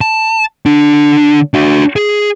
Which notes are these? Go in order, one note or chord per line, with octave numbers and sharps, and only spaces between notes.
A5
D3 D4
D4 F#4
G#4